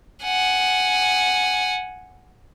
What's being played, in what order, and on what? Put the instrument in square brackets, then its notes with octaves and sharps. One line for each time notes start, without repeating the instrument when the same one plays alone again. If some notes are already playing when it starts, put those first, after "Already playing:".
[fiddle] F#5 G#5